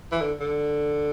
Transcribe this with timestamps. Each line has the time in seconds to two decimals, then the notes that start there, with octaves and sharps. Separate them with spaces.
0.11 E3
0.21 D3
0.40 D3